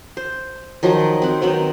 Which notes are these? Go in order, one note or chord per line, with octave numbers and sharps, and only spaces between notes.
C5
D#3 F3 F#3 C6
C4 F#5
D#3 F#3 B3 C4